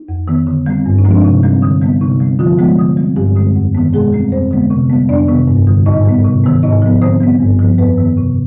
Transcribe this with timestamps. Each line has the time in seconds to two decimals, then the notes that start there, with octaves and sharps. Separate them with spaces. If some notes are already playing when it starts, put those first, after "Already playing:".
Already playing: D#4
0.09 F2
0.28 D#3 B3
0.47 D3
0.66 G3 C4
0.86 G2
0.98 D#4
1.05 F3 G#3 C4
1.11 D4
1.24 C3 D#4
1.43 G3 C4
1.63 D3
1.82 G3 B3
2.01 C3 D#4
2.20 G3 C4
2.39 D3 F3 F4
2.59 F3 G#3 B3
2.78 D3
2.97 G3 C4
3.16 G2 G3 G4
3.36 D3 G#3 C4
3.55 F2
3.75 D#3 B3
3.93 B2 G#3 G#4
4.13 G3 C4
4.32 F2 C4 C5
4.51 D3 G#3 B3
4.70 C3
4.90 G3 B3
5.09 F2 D4 D5
5.28 C3 D#3 B3
5.48 G2
5.67 D3 G3
5.86 G#2 D#4 D#5
6.05 G3 B3
6.25 C3
6.44 D#3 B3
6.63 G#2 D#4 D#5
6.82 F3 B3
7.02 D3 C4 C5
7.20 G3 B3
7.40 G2
7.59 F3 B3
7.78 F2 B3 B4
7.98 D#3 B3
8.17 C3